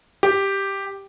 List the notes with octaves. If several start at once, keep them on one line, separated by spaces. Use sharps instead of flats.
G4